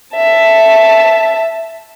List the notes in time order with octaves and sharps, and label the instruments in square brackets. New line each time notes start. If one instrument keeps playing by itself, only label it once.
[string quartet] E5 A5